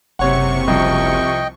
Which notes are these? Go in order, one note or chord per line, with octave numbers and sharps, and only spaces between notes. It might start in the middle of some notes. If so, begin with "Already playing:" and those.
F#1 C3 C#5 F#5 C#6
C2 F3 D#5 G5